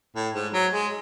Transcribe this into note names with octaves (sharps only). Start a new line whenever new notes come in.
A2
G#2
F#3
G#3